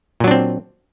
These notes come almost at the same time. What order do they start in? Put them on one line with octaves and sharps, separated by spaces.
A#2 F#3 D4 C4